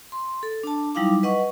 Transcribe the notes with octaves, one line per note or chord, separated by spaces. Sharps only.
C6
A4
D4 A5
F#3 G3 D#4 E4 F5 D6
B4 D#5 F#5 C#6